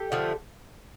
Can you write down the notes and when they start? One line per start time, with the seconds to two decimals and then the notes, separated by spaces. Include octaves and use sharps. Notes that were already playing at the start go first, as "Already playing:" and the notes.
Already playing: G4 A4
0.12 D3 F3 A3